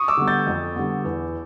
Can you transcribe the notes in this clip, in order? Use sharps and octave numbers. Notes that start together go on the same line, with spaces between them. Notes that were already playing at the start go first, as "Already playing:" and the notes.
Already playing: C#6 D#6
D6 E6
D3 G3 B3
G6 A6
F2
D3 G3 B3
E2